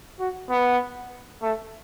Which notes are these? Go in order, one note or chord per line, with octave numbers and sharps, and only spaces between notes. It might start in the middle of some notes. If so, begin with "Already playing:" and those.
F#4
B3
A3